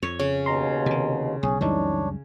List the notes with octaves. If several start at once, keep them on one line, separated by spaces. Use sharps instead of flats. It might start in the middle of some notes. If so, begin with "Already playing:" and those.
F2 C#5
C#3 C#5
D#2 B2 A#5 C6
C3 D#3
B1 C#4 G#4
C#2 F#2 E3 G3 D4 D#4 C#5